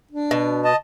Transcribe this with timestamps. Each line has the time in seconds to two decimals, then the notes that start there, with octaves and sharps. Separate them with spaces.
0.11 D4
0.31 B2
0.65 D#5 A5